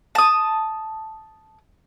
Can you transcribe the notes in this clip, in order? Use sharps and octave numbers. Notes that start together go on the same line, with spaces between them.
A5 D#6